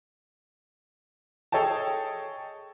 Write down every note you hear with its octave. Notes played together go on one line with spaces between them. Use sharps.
G#4 A4 C#5 D#5 G5 A5